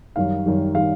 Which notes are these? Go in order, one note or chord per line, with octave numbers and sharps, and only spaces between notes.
F#2 D#3 G3 F5
F#2 D#3 G3
D#3 G3 F5